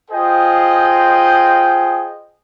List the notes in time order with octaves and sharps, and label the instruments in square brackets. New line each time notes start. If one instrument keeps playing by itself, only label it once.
[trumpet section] F4 G#4 C5 D#5 G5